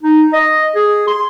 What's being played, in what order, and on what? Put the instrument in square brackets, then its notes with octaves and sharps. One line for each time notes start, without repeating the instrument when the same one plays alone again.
[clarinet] D#4
D#5
G#4
C6